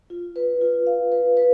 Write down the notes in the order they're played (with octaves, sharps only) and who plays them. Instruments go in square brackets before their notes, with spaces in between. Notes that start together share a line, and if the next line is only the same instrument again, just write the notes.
[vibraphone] F4
B4
F4
F5
B4
B4